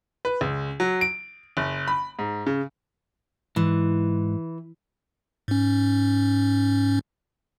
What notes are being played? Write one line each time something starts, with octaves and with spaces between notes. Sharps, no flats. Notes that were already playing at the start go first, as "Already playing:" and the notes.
B4
C#2
F#3
D7
F#1
B5
G#2
C#3
G#2 E3
G#2 C#4